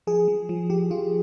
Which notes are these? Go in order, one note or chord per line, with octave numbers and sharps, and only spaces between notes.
F3 G#4
F3
F3
F3 G4
F3 F4